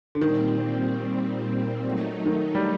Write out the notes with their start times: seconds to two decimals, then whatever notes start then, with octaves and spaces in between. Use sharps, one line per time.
0.15 D3
0.21 A#2 D#3 G3 C4
1.85 F#3 A3 D#4
2.26 D#3
2.55 G3